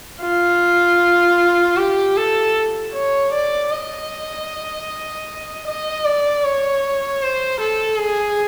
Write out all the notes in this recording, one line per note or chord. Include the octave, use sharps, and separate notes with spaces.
F4
G4
A4
C#5
D5
D#5
D#5
D5
C#5
C5
A4
G#4